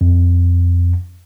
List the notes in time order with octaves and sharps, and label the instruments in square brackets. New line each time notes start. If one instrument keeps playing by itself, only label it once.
[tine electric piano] F2